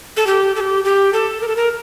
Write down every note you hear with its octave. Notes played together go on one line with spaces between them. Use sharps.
A4
G4
A4
G4
G4
A4
A#4
A4
A#4